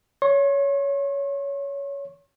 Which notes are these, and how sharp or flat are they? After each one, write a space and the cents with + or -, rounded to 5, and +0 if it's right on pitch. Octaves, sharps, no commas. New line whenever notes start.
C#5 +15 C#6 -45